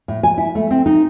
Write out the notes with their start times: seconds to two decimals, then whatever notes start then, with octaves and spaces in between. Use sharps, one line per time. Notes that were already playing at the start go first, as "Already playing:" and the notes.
0.08 A2
0.23 G#5
0.38 E4
0.55 A3
0.71 C4
0.86 D#4